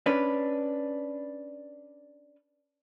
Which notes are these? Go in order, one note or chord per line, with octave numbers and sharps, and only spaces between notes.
C#4 D4 B4